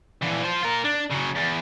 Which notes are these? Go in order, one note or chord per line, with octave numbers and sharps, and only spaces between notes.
A#2 E3
F4 C5
F4 A#4
D4
C#3 F#3
E2